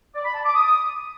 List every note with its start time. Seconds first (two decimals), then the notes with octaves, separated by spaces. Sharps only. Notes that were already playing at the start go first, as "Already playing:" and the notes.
0.15 D5
0.24 B5
0.34 A5
0.44 D6
0.54 D#6